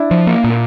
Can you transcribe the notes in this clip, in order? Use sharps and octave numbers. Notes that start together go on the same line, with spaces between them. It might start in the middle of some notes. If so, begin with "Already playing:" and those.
Already playing: D4 E4
F3
A#3
A#2